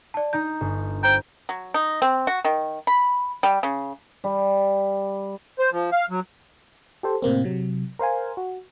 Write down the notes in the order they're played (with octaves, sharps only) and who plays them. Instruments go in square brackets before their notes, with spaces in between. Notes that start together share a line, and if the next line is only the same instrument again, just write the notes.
[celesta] D5 A5
[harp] D#4 D#5 A#5 [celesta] G6
[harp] G1
[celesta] C5 A#5 [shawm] G5
[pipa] F#3
D#4
C4
F#4
D#3
B5
G3
C#3
[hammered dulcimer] G3
[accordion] C5
F3
F5
F#3
[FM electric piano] G4 A4 C5
A2 C3 A#3 C4
C3 F#3
A#4 C5 F5 G#5
F#4